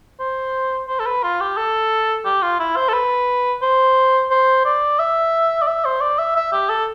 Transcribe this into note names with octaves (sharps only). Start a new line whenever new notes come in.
C5
C5
A4
B4
F4
G4
A4
G4
F4
E4
C5
A4
B4
C5
C5
D5
E5
D5
E5
C5
D5
E5
E5
G4
A4